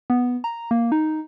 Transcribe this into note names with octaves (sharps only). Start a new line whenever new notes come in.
B3
A#5
A#3
D#4